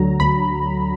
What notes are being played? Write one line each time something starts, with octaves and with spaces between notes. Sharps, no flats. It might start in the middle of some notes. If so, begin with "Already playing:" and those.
Already playing: D2 D3 F#3 A#5
D2 B5